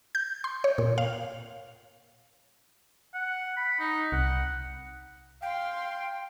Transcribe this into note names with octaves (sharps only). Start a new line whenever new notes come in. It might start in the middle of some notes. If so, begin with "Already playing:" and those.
G6
C6
C#5
A#2
F5
F#5
B5
D#4
C2 F#5
F5 G5 C6